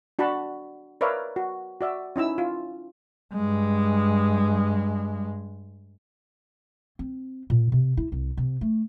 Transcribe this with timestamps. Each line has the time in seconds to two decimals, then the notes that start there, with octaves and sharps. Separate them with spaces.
0.19 D4 F#4 F#5 A5 B5
1.01 A#4 B4 C#5 D5 E5 F5
1.36 F#4
1.81 F#4 D5 E5
2.16 C#4 D#4 E4 E6
2.38 F4
3.34 G2 G#3
6.99 C4
7.50 A#2
7.72 C3
7.97 E4
8.12 C2
8.37 C3
8.61 A3